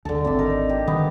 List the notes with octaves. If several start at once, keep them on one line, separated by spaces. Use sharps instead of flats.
D2 D3 A4
G#1 C4 D5 E5
D#4 A#4
G4
D#3 E3 B3